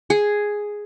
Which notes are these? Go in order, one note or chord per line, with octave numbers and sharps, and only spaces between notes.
G#4